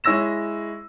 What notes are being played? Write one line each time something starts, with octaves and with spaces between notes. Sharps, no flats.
G#3 E4 C#5 E6 A#6 E7